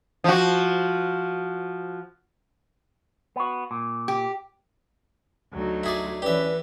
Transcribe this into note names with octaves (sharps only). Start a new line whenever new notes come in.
F3 F#4
B3 F#4
A#2
G4
D2 F#3 D#4
E4 G#4 D5
E3 C#4 G4 B4 D5 E5